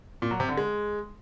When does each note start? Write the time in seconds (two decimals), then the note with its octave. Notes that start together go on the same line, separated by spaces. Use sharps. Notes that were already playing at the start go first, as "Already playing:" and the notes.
0.22 A#2
0.31 F#3
0.40 C3
0.49 D3
0.57 G#3